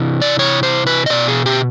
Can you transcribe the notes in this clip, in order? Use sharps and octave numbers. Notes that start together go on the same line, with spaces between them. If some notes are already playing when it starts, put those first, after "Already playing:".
Already playing: C3 E3
D5
C#5
C5
B4
D#5
B2 D5
G#4
G4